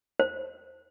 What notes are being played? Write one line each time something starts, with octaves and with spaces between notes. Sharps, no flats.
C5